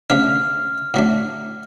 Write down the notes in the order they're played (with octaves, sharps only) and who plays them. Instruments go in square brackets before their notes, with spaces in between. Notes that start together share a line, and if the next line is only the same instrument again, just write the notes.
[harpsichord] C#3 F3 A3 D4 [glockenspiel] F6
[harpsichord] A2 F#3 A3 D4